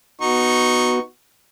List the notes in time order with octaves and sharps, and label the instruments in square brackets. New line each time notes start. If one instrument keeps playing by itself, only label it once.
[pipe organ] B3 F#4 [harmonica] D#4 C#6